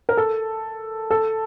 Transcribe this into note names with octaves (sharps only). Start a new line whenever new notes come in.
A#4
A4
A4